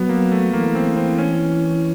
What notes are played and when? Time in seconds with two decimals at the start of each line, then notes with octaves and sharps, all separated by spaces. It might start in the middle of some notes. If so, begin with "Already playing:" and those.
Already playing: F#3 B3
0.09 A#3
0.32 A3
0.53 E3 A#3
0.75 C4
0.97 C4
1.18 C#4